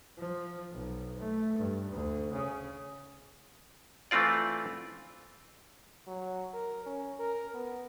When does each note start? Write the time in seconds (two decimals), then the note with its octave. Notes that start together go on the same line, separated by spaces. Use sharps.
0.18 F3
0.72 B1
1.19 A3
1.59 G2
1.91 D2
2.33 C#3
4.11 E3 A3 C4 F4 D5
6.07 F#3
6.54 A#4
6.86 C#4
7.20 A#4
7.54 B3